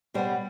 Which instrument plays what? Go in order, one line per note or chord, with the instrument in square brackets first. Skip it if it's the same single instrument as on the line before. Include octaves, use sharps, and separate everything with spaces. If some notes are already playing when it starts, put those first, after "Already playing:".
[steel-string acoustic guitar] B2 G3 B3 C5